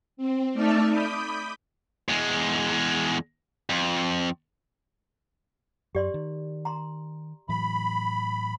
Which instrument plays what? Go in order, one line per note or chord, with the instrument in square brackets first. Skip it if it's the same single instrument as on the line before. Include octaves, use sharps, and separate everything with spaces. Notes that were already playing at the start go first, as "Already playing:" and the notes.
[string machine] C4
A3 D#4 D5 E5 A5 F6
B5 D6 D#6 G6
[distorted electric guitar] E2 G#3
F2
[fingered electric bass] F#2 [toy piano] G4 D5 C6
[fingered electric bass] D#3
[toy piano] A#5 C6
[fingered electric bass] A2 E3 F#3 [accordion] B5